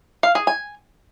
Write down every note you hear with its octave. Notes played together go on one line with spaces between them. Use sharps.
F5
G#4
G#5